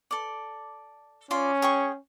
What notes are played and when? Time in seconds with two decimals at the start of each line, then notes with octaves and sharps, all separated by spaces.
0.11 A4 D5
1.31 C#4 F4 D5 C6
1.62 G#4 G5 C#6